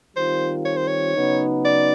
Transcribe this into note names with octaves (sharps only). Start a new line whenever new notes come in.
D#3 G3 C4 F4 A#4 C5
C#5
C5
C#5
C#3 F#3 B3 D#4
D5